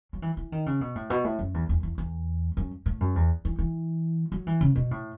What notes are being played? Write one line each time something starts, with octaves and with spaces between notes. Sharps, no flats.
F#3
E3
E3
D#3
C#3
B2
A2
B2
A2
F#2
E2
E2
E2
E2
F#2
A2
F#2
E2
E3
E3
F#3
E3
C#3
B2
A2